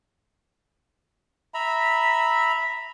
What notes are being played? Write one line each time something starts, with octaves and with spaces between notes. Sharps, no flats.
E5 A#5 B5